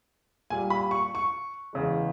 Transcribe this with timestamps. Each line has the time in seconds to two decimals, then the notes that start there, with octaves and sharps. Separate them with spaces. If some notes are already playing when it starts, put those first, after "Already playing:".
0.50 A#2 G3 G#5
0.70 B5
0.91 C#6
1.15 C#6
1.73 E2 C#3 G#3